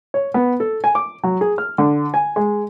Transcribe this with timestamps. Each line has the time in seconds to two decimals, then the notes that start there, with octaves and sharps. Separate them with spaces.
0.14 C#5
0.34 B3
0.60 A4
0.84 G#5
0.95 D6
1.24 F#3
1.41 G#4
1.58 F6
1.78 D3
2.14 G#5
2.36 G#3